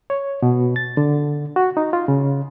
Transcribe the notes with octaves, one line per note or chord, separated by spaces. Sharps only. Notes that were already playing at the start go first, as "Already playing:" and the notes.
C#5
B2
A6
D3
F#4
D#4
F4
C#3